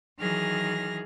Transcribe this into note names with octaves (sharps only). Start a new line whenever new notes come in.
D#3 E3 F#3 G#4 F6 A#6